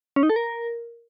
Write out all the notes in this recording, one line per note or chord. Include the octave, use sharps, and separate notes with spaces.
C#4
D#4
A4
A#4